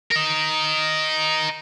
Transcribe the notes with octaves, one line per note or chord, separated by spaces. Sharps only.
A#4 D#5